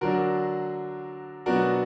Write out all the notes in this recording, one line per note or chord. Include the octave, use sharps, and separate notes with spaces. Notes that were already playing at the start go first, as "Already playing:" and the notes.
D3 F#3 D4 F#4 A#4
B2 F#3 B3 D4 F#4 A#4